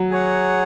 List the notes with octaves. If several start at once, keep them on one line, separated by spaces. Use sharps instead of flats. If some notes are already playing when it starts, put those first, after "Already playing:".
Already playing: F#3
G#4 C#5 F#5